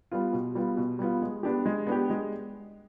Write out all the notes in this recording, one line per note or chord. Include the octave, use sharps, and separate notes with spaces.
G3 B3 F4
B2
G3 B3 F4
B2
G3 B3 F4
G#3
B3 D4 G4
G#3
B3 D4 G4
G#3